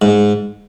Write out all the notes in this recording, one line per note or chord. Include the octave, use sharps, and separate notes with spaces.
G#2